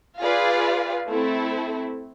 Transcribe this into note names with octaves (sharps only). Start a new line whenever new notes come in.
F4 G#4 B4 D5 F5
A3 C4 E4 A4